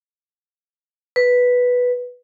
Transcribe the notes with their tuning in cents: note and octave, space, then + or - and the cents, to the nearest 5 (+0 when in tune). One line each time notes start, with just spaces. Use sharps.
B4 -5